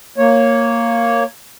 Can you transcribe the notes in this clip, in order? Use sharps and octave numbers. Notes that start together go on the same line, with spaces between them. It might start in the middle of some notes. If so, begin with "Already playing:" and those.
A#3 C#5